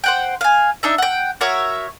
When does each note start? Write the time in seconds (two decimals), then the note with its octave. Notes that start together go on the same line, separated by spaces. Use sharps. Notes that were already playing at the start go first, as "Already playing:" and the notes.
0.04 C5 F#5 G5
0.41 F5 G#5
0.83 D4 D#4 E5
0.98 F#5 G5
1.41 F#4 A#4 C#5 E5